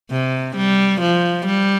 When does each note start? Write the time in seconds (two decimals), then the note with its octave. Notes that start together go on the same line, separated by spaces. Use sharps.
0.11 C3
0.56 G3
1.01 F3
1.46 G3